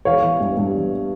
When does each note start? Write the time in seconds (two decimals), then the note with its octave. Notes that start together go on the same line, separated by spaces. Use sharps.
0.05 E3 C#5 F5
0.22 E3
0.40 G2
0.57 G2
0.75 E3